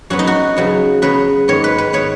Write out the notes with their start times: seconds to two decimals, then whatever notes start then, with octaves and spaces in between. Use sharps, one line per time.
0.10 F#2 F#3 B3 F#4
0.19 D#4
0.27 F#4
0.56 C#3 F#3 B3
1.02 C#3 F#3 B3 B4
1.48 G#2 D#3 B3 C#5
1.64 B4
1.78 B4
1.93 D#3 B3 C#5